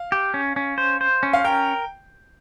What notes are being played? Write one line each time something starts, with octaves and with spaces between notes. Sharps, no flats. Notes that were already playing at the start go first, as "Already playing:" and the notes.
Already playing: F5
G4
C#4
C#4
C5
C5
C#4
F5
A#4 G5